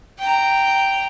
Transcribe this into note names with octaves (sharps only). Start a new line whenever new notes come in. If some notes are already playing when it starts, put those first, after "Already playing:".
G5 A#5